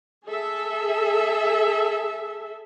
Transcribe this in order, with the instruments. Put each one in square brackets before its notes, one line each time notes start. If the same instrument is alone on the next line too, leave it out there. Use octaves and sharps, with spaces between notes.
[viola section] G#4 A4 E5